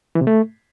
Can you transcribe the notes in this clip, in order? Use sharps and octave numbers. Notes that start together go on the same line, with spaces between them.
E3
C3
A3